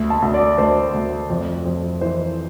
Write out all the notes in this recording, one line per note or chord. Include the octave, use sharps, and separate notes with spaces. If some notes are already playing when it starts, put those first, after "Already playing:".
Already playing: D2
A5
D2
D5
D2 C5
D2
F2
F2
E3 C5